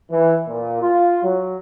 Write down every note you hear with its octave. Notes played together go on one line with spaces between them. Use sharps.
E3
A#2
F4
F#3